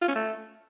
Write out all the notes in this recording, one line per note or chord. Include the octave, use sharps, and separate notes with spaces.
F4
C#4
A3